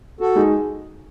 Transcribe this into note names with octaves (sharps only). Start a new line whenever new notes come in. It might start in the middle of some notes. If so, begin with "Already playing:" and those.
F#4 A4
G#3 D#4 G#4